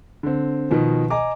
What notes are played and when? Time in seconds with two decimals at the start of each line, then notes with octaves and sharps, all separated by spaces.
0.23 D3 C4
0.71 B2 D#3 F3
1.10 D#5 G#5 A#5 D6